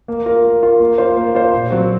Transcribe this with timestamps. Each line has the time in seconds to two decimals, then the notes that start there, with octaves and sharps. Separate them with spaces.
0.08 A#3
0.26 F4 A#4
0.45 A#3
0.62 F4 A#4
0.80 A#3
0.98 F4 C5
1.17 A#3
1.35 F4 C5
1.53 A#2
1.70 F#3 C4 F#4